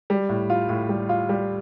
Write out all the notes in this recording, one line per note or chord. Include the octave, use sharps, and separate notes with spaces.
G3
A2
F4
A2
G3
F4
G3